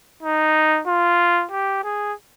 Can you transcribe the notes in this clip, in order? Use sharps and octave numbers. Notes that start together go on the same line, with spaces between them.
D#4
F4
G4
G#4